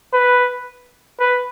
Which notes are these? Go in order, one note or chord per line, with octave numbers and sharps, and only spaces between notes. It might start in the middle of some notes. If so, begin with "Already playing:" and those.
B4
B4